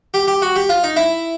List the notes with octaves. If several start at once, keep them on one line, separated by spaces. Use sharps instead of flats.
G4
G4
F#4
G4
F4
D#4
E4